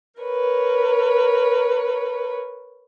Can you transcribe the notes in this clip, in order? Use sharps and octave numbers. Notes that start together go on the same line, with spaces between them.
A#4 B4 C#5